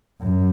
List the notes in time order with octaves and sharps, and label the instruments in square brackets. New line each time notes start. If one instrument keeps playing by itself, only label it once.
[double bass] F#2